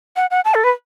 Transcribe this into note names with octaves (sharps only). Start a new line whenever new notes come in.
F#5
F#5
A5
A4
B4